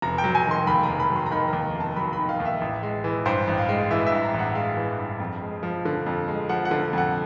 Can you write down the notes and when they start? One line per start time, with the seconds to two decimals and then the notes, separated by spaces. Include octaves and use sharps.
0.02 F1 A#5
0.18 G5
0.24 F#3
0.35 G#5
0.45 D#3
0.51 C6
0.67 D#2 B5
0.83 A#5
0.89 F1
1.00 B5
1.10 F#3
1.16 C6
1.26 A#5
1.31 D#3 B5
1.48 A#5
1.53 D#2
1.75 F1
1.80 A5
1.96 F#3 B5
2.13 B5
2.18 D#3
2.29 F5
2.40 D#2
2.45 E5
2.61 A1
2.83 G#3
3.04 E3
3.26 G2 C5
3.47 A1
3.58 F5
3.69 G#3
3.91 E3 E5
4.06 E5
4.12 G2
4.23 A#5
4.34 A1
4.39 F#5
4.55 G#3 F5
4.77 E3
4.99 G2
5.20 F2
5.42 G#3
5.63 F3
5.85 D3
6.06 F2
6.28 G#3
6.49 F3 F#5
6.65 F#5
6.71 D3
6.93 F2 F#5